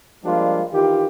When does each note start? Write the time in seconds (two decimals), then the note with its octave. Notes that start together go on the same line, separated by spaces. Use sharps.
0.24 F3 G3 G#3 A#3 D4 F4
0.73 D#3 E3 F4 G4